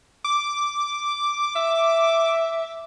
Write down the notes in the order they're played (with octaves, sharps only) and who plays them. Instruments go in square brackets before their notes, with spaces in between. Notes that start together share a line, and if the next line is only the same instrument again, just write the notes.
[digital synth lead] D6
[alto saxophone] E5